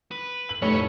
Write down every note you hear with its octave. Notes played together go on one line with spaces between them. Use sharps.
B4
F#7
F1 A2 C#4 B4 C#5 C#6 G7